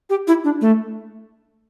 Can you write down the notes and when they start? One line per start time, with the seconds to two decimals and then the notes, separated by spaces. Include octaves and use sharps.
0.10 G4
0.28 E4
0.44 D4
0.61 A3